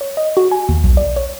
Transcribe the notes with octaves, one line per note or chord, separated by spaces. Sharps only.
C#5
D#5
F#4
G#5
D#2
B1
D5
C#5